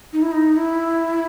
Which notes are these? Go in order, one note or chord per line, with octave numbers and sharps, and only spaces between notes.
D#4
E4
D#4
E4